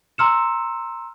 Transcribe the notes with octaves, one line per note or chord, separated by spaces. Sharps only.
A#5 C6 E6 F6 C#7 E7